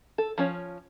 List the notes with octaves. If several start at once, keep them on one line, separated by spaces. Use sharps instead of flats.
A4
F3 C#4 C#5